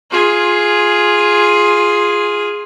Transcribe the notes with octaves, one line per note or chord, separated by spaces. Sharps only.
F4 G#4